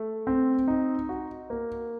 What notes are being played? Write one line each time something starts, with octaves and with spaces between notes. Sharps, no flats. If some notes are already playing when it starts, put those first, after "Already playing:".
Already playing: A3
C4
D#4
F#4
A#3